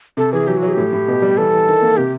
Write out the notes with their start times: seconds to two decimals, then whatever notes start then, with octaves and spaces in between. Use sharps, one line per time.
0.17 C3 A4
0.33 E3 G#4
0.47 F#3 G4
0.57 F#4
0.63 F#3
0.68 G#4
0.73 A2 G4
0.93 A2
1.08 B2
1.22 G3
1.37 E3 A4
1.53 E3
1.68 D#3
1.82 A#3
1.97 C3 G4